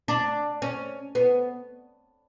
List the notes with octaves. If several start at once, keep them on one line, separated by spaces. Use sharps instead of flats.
D4
C#4
B3